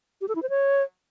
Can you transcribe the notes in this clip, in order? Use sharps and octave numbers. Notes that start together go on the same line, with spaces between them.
G4
A4
E4
C5
C#5